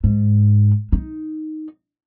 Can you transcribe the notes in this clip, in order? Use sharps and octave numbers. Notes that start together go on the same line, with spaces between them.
G#2
D#4